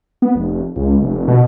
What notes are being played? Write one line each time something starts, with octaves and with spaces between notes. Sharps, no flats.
B3
F1
C#2
F1
B2